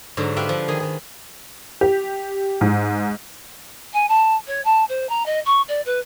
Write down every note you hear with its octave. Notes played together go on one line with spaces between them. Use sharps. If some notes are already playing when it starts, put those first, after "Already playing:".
G#2 D3 F#3
F4 G4 B4 E5 F5 G5
F3
D#3 G#4
D#3 G#4
G4
G#2
G#5
A5
C#5
A5
C5
A#5
D#5
C#6
D5
B4